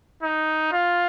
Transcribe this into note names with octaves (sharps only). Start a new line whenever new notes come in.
D#4
F4